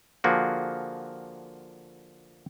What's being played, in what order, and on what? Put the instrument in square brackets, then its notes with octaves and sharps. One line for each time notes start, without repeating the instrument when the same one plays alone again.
[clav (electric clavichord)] D3 F3 A#3 F#4 G#4